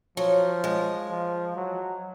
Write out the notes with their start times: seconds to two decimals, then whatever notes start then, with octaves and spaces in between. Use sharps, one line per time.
0.17 F3 F#3
0.64 G#3
1.10 F3
1.56 F#3